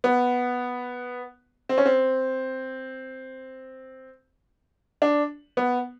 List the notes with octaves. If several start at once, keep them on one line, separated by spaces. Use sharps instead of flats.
B3
C4
C#4
C4
D4
B3